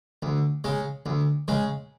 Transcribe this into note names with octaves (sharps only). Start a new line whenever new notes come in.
D2
C#3 G#3
D2
C#3 G#3